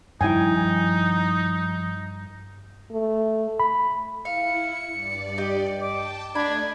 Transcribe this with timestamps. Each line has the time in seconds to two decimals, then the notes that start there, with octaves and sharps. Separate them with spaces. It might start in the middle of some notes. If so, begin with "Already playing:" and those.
0.21 G2 D#3 F3 D#4 E4 G5 G#5
2.91 A3
3.60 B5
4.25 E4 F5 C#7
4.90 G2 D5
5.38 G4 D#5
5.81 G5 A5 D6
6.35 A3 D4 D5 D#5 B5 G#6